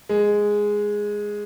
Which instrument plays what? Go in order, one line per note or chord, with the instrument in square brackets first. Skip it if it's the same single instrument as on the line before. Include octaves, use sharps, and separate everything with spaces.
[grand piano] G#3